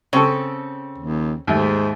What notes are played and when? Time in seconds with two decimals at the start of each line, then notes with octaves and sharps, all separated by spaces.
0.13 C#3 C4 A4
0.98 D#2
1.47 D#2 G#2 A3